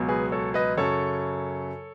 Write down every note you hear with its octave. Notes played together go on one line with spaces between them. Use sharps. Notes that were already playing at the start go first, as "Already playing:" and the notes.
Already playing: C#2 B2 F#3
G#4 B4
A4 C#5
B4 D#5
F#2 C#3 F#3 A4 C#5